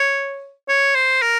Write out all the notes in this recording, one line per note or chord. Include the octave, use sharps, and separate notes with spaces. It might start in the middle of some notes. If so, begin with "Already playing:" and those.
Already playing: C#5
C#5
C5
A#4